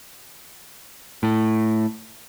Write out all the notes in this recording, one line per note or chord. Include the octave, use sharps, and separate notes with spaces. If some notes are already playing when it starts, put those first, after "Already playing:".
A2